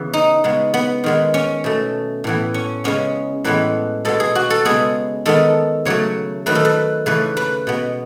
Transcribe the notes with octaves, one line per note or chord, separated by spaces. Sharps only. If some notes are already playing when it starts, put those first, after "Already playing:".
Already playing: C#3 E3 B3
D#4
C#3 G#3 B3
B3
D#3 G#3 B3
C#4
B2 A3
A2 E3 B3
C#4
C#3 G#3 B3 C#4
A2 E3 G#3 B3 B4
B2 G#3 B3 A4
G#4
F#4
A4
C#3 G#3 B3 G#4
D#3 G#3 B3 A4
C#3 F#3 A3 C#5
D#3 F#3 A3 B4
A4
B4
C#3 E3 A3 B4
B4
B2 G#3 B3